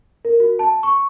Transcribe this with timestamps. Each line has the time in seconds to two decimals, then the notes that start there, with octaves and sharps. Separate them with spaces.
0.25 A#4
0.40 F#4
0.59 A5
0.83 C#6